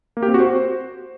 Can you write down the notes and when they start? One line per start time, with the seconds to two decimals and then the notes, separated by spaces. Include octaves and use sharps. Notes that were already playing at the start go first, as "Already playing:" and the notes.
0.17 A#3
0.23 G4
0.28 C4
0.34 F#4
0.40 C5